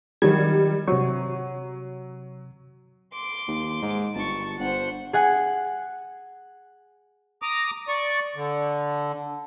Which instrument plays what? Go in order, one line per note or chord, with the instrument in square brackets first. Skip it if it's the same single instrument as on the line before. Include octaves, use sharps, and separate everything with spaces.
[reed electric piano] D#3 F#3 G#6 [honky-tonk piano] G3
[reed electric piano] C3 C#6 [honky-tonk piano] F#3
[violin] C6 D6
[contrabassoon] D#2
G#2
[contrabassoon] G1 [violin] A5 C#6
[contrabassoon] G1 [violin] C5 F#5
[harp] G#4 F#5 G#5
[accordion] A#5 D6 D#6
D5 C#6
D3